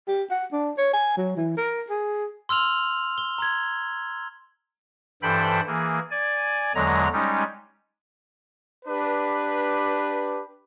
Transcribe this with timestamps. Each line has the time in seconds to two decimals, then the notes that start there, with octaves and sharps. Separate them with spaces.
0.08 G4
0.31 F#5
0.52 D4
0.78 C#5
0.93 G#5
1.17 F#3
1.37 E3
1.57 A#4
1.90 G#4
2.49 C6 E6 F6 F7 F#7
3.18 G7
3.38 A#5 C6 G#6
5.22 G2 E3 A4 C5 G5 B5
5.67 E3 A#3 G#4
6.11 D5 G#5
6.75 E2 D3 F#3 G#3 A#5
7.13 G3 G#3 C#4 D#4
8.86 D4 G4 B4